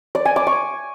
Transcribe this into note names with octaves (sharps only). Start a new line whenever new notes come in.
D5
G#5
D6
C#6